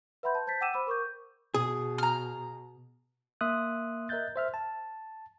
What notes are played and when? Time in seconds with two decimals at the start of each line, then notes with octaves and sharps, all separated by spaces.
0.23 B4 E5 F#5 B5 C6 G6
0.35 A5
0.47 C5 A5 G6 A6 B6
0.61 F#5 G5 D6 E6 D#7 E7
0.73 C5 B5 D6 E6
0.87 A#4 C#6 D6 G6
1.54 B2 G#4
1.98 A#5 F6
3.41 A#3 E5 C6 D#6 F#6
4.09 A#4 D#5 E5 F#6 G6 A6
4.36 C5 E5 F6
4.54 A5